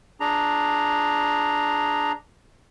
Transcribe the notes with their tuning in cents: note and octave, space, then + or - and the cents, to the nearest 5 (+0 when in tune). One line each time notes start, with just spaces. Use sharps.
D4 +0 G#4 +0 A#5 +0